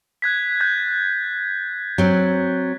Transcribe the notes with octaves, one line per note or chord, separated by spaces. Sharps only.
F#6 G#6 B6
F#6 G6 A6
F#3 C4